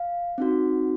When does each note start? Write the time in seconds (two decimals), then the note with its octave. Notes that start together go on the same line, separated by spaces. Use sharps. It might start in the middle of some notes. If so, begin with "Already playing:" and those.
Already playing: F5
0.38 C4 D#4 F#4